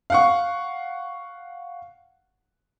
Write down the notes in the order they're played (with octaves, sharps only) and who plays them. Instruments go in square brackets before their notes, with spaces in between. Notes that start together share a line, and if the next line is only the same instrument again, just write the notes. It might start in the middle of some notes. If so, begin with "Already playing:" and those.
[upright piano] F5 F#5 C#6